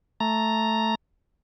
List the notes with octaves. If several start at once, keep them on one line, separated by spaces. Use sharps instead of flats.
A3 A#5